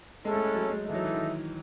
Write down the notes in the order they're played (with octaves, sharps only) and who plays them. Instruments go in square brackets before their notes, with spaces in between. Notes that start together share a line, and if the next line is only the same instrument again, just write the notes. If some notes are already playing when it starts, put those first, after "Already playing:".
[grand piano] G#3 [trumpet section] C#4 E4 A4
[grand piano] A3
G#3
F#3
G#3
[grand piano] E3 G#3 [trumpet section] D#4 A4 E5
[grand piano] F#3
E3
D#3